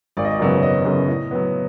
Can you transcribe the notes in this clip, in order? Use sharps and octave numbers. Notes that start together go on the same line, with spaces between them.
G#1 D5
D#5
D5
F#2 C#3 F#3 B3
G#1 D#5
F#2 C#3 F#3 B3
A2
F#3 B3